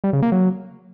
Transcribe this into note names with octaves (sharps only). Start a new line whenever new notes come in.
G3
C#3
A#3
F#3